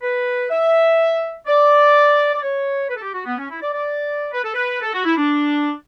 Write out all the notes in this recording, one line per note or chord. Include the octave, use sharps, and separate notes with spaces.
B4
E5
D5
D5
C#5
B4
A4
G4
F#4
B3
C#4
E4
D5
D5
B4
A4
B4
A4
F#4
E4
D4